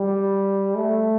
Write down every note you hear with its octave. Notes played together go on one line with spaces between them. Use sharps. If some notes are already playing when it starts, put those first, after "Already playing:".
Already playing: G3
A3